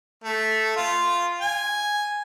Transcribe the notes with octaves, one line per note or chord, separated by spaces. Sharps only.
A3
F4
G#5